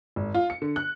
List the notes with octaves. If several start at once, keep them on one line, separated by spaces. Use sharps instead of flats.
G#1
F4
C#7
D3
F#6